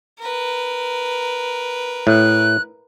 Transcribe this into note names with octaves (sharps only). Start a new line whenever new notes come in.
A#4 B4
A2 F#6